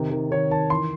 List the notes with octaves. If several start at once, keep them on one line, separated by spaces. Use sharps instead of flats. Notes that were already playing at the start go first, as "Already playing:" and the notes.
Already playing: C3 D#3
D#3
D#3 C#5
D#3 A5
E3 C6